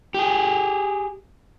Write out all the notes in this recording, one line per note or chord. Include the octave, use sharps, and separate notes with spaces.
G4 G#4